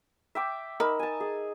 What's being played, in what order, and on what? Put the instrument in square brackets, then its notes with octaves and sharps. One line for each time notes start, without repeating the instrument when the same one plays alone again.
[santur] E5 G5 D6
[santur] D#4 E6 [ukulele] A#4 B5
[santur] G#5 A5
G#4